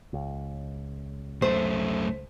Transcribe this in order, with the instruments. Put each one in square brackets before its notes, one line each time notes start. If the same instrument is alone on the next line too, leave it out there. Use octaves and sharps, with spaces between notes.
[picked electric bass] C#2
[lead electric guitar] F#2 A3 [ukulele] C5